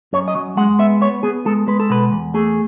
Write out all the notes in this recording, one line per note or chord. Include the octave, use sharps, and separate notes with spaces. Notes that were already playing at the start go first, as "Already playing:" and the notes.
F#2 C#5
D#5
F#3
G#3 F#5
B3 E5
B3 C#5
B3 G#4
G#3 A4
G#3 B4
A4
B2 B4
E2
A3 G#4